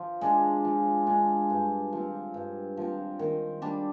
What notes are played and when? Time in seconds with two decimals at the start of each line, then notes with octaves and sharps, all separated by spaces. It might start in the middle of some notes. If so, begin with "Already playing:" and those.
Already playing: F3
0.21 G#3 D4
0.65 F3
1.07 G#3 D4
1.50 G2
1.93 F3 C4
2.34 G2
2.77 F3 C4
3.19 D#3
3.62 G3 D4